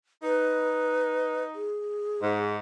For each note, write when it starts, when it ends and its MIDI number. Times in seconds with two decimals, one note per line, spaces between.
0.23 1.65 63
0.23 1.43 71
1.55 2.53 68
2.21 2.58 44